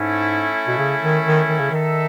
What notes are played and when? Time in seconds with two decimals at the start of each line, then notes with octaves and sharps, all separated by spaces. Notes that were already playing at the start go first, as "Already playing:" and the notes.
Already playing: G#2 A3 C#4 E4
0.67 B2
0.78 C#3
1.02 D#3
1.25 D#3
1.49 D#3
1.59 C#3
1.71 D#3 D#4 A4 E5